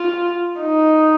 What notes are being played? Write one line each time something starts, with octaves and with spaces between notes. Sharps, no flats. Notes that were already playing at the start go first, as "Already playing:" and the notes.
Already playing: F4
D#4